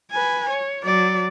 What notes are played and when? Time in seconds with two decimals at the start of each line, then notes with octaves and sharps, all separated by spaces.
0.11 B4 G#5
0.49 C#5
0.84 F#3 D5